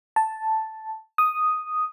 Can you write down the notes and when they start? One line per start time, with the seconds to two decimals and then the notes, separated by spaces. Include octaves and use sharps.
0.16 A5
1.18 D#6